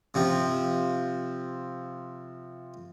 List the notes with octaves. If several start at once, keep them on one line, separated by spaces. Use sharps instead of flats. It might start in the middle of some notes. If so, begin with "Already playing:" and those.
C3 F3 C4